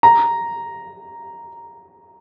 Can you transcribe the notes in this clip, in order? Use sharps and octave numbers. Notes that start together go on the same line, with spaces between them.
A#5